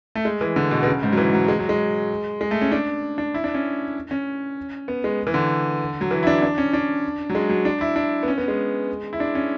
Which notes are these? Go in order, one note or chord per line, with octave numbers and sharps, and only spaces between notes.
A3
G#3
E3
D3
B2
B2
C#3
G#2
F#3
E3
F#3
G#3
F#3
G#3
G#3
A3
C#4
D4
D4
E4
D4
C#4
C#4
B3
G#3
E3
D3
F#3
E3
E4
D4
D4
C#4
D4
F#3
G#3
F#3
D4
E4
D4
B3
C#4
B3
G#3
E4
D4
C#4